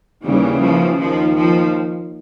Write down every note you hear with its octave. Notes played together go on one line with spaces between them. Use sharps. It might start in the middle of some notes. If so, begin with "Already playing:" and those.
D#2 C#3 E3 G3
F3
D#2 D#3 F3
F3